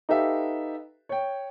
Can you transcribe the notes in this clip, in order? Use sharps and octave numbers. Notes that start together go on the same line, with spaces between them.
D#4 G4 A4 B4 E5 F5
C#5 G5